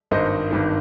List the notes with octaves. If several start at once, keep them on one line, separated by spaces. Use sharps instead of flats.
G#1 G2 D#3 C5 D#5
G#1 G2 D#3